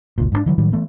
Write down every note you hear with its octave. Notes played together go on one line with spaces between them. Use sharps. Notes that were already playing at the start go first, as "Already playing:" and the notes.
F#1 C#2 A#2
G#2 C#3 D4
D3 E3 F#3
A2 D#3 F#3 G3
E3 A3 B3